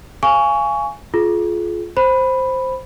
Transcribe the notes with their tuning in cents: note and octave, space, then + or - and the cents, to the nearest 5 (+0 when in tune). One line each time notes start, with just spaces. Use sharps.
F5 -25 G#5 +0 C#6 +20
F4 +0 G#4 +35
C5 +0 B5 +0